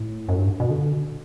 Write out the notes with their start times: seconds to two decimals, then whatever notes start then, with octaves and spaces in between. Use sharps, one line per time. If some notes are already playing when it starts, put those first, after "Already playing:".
Already playing: A2
0.29 F#2
0.39 G2
0.60 B2
0.70 D3